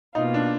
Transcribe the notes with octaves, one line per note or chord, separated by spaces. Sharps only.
B2 A#3 D#4 F4
D4